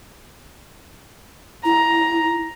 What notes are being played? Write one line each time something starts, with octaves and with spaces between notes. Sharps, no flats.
E4 A#5